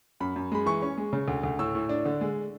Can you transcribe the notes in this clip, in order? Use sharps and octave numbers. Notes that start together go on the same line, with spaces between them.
F#2 B5
F#2
G#3 B5
E3 C#6
C#4
G#3
C#3
D2
D2
A2 E6
A2
D4
D3
G#3